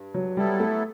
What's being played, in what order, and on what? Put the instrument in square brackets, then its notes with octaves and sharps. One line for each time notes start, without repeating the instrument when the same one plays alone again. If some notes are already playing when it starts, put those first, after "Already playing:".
Already playing: [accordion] G2
[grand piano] F#3
[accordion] F#3 B3 E4 A4 [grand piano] G3
[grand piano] A3